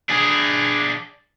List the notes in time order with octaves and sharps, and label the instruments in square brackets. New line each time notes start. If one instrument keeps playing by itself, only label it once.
[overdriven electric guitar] D4 G#4